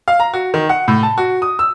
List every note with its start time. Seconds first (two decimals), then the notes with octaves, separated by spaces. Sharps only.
0.08 F5
0.20 A#5
0.34 F#4
0.54 D#3
0.69 F#5
0.88 A2
1.03 A5
1.18 F#4
1.42 D#6
1.59 E6